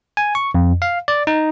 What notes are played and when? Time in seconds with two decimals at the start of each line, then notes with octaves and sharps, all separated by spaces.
0.17 G#5
0.35 C#6
0.54 F2
0.82 F5
1.08 D5
1.27 D#4